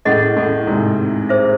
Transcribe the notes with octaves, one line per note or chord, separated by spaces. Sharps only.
A2 C#4 G#4 D#5 F#5
A2
G#2 C3
G#4 C5 E5